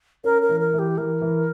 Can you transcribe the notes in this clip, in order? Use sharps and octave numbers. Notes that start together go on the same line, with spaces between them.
C#4 A#4
A#4
E3
A#4
E3
G4
E3 A#4
E3